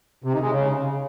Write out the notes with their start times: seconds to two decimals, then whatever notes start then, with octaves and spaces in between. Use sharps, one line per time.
0.24 C3
0.33 D#3
0.42 G#3
0.51 C#3